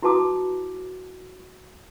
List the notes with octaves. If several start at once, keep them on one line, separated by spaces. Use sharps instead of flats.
E4 F#4 B4 A5 D6 D#6